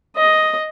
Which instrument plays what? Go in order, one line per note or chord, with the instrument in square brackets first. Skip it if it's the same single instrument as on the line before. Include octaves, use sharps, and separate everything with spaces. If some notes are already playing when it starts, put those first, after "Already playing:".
[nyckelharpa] D#5